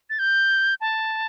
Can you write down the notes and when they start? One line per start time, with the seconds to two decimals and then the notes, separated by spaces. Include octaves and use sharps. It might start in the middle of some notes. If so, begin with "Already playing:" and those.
0.10 A6
0.19 G6
0.81 A5